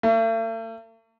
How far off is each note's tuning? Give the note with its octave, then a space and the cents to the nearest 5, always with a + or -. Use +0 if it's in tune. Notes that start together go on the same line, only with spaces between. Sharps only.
A3 +45